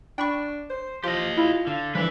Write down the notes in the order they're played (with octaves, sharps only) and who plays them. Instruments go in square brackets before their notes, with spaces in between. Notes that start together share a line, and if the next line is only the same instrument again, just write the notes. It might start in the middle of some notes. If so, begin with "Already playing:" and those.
[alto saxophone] D4 [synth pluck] G5 B5 C#6
[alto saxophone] C5
[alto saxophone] F3 [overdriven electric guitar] G4 D#5 [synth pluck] C6
[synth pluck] E4 [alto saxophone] F4
[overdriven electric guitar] D3 [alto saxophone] F5
[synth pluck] E3 F3 G3 [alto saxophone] D4 [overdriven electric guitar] E4 B4